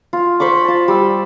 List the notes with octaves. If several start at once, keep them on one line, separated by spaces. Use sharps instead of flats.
F4
C5 B5 C#6 D6
F4 A5
G3 E6